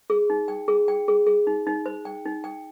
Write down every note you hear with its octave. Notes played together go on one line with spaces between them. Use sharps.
G#4
D#4
G5
G#4
G5
G#4
G#4
D#4
D#4
C5
G5
D#4
G5